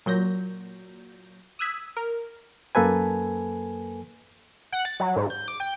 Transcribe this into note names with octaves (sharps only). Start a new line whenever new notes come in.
A#2 F#3 G6 A#6
D#6 E6 F#6 G#6 B6
A#4
F#2 A#3 A4 B4 G#5
F#5
A6
F#3
G#2
G6
D6
G5